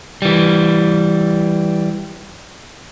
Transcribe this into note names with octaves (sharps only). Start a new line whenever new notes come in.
E3 G3